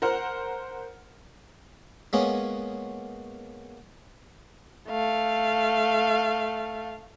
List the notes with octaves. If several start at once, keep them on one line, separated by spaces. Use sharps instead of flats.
A#4 C5 F#5 F6
G#3 A#3 B3 C#4
A3 F5